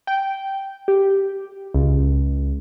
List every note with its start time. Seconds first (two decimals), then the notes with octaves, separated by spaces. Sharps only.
0.07 G5
0.88 G4
1.74 C#2